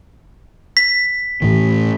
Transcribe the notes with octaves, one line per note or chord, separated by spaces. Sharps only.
B6
A2 E3